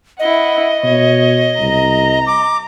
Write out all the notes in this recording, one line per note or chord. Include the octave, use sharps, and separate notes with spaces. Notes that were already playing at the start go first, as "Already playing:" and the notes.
E4 D#5 F#5
B2 C#5
C2 A#5
D6